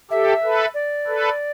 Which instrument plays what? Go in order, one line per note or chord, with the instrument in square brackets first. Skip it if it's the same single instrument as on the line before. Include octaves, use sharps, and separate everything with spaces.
[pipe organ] G4 A4 [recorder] E5
[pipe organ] A4 B4
[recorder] D5
[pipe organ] A4 B4